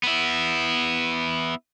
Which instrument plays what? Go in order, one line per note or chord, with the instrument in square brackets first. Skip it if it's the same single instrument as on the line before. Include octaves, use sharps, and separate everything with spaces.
[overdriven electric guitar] B3 E4